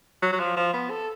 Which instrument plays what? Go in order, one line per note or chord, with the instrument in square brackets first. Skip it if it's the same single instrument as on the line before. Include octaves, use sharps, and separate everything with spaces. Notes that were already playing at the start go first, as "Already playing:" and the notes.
[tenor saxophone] F#3
F#3
F3
F3
B3
A4